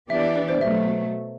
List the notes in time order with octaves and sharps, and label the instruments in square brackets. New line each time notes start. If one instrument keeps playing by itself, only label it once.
[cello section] E3 B3 D4 G4 D5 [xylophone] E5
[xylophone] B4
C5
[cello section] B2 F#3 A3 [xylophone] E5